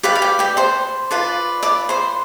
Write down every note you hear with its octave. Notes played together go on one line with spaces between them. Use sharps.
G4 B4 D5 F5
F5
G4 G5
G4 G5
C5 C6
F4 B4 D5
D5 D6
C5 C6